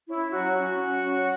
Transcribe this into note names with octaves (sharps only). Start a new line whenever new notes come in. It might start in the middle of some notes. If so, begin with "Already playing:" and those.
C#4 E4
F#3 F#4
C#4 F#4
C#4
F#3